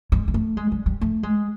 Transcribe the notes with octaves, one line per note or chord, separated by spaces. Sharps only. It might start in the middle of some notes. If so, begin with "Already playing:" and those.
G#3
G#3
A3
G#3
G3
G3
A3
G#3